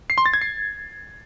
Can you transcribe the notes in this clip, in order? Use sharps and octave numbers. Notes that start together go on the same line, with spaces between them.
C7
C6
A6
G#6
C7